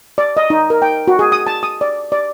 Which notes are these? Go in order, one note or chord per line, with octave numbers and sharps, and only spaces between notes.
D5
D#5
D#4
A#4
G5
F#4
G#4
D#6
A5
D#6
D5
D5